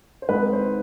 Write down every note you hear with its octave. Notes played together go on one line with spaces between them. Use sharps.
C5
G#1 G#2 D#3 B4
C5